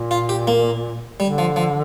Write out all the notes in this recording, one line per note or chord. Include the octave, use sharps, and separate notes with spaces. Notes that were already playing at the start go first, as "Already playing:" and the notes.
Already playing: A#2
F4
G4
A#3
D3 G3
F3
F3